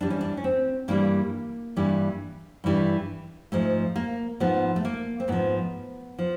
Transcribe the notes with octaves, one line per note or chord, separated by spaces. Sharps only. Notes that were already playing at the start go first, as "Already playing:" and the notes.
G2 E3 G3 D4
C#4
D4
C#4
C4
G2 E3 G3 A#3
G2 E3 G3
G2 E3 G3
G#2 F3 A3
A#3
G#2 F3 B3
A3
A#3
C4
G#2 F3 B3
F3